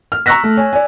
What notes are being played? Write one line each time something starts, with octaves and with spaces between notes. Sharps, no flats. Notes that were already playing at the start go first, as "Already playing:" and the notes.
F6
A#5 C#6 E6 F#6 A#6 B6
A3
C#5 G#5
D5 G#5